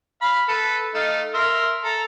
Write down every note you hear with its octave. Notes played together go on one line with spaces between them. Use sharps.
F5 B5
A4 B4
A3 D#4 F5
A#4 E5 C6
A4 A#5